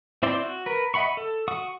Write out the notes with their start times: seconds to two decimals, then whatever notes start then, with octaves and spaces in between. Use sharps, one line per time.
0.23 C4 E4 C5 D5 G5
0.43 F#4
0.66 A#4 B4
0.94 D#5 E5 F#5 B5 C#6
1.17 A4
1.48 F#4 F#5 C#6 D#6